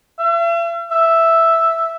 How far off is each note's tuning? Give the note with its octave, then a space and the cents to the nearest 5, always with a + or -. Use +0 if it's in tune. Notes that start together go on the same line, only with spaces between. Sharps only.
E5 +45
E5 +0